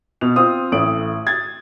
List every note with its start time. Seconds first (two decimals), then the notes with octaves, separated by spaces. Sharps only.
0.21 B2 F7
0.36 C4 F4 D#6
0.72 A1 A3 D7 F#7
1.27 G#6 A6